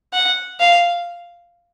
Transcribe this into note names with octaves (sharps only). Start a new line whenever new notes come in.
F#5
F5